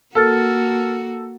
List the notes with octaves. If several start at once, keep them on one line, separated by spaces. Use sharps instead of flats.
A#3 F#4 A4 A#4 F6 A6